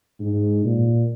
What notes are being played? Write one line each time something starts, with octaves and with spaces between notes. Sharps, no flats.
G#2
A#2